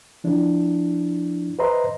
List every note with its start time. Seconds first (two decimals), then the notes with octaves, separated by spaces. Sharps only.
0.24 F3 D4 E4
1.59 B4 C5 D#5 E5 A#5 C6